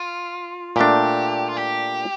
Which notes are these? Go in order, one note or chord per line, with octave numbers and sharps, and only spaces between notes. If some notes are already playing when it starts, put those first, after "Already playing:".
Already playing: F4
A#2 A3 D4 G4
F4
G4